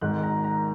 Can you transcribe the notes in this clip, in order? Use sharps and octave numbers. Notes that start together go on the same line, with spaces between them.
G#1 G#2 D#3 G#3 F#6
A#5
A#5